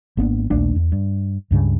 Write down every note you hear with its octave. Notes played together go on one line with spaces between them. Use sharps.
G#1 A#3 B3 D4
A#1 D#2 A3 D4
E2
G2
C#2 G2 C#3